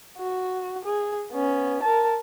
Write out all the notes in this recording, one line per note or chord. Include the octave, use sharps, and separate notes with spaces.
F#4
G#4
B3 C#4
A#4 A5